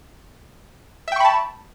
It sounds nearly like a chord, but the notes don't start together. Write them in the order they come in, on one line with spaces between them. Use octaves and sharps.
E5 G5 C#6 B5 A5